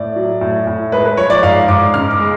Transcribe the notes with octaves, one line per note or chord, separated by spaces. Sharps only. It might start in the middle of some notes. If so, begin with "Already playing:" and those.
Already playing: A2 D5
F#3
A2
A2
G#3 B4
B4
F3 C#5
D5
G#2 F5
G#2 D6
C#3 F6
D6
G#3